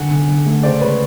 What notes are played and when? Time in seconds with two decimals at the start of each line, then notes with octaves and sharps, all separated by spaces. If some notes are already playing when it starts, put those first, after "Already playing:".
Already playing: D3 F#5 G#5
0.11 D3
0.29 D3
0.46 A3
0.63 C#3 C5 D5
0.81 G#3 B4 C#5